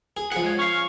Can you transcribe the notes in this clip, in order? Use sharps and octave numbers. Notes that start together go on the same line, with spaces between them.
G#4
F3 G#4 F#5
G#3 C#5
C#4 F5 C#6